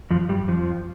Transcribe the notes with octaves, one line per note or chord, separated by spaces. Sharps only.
F2 F3
G2 G3
F2 F3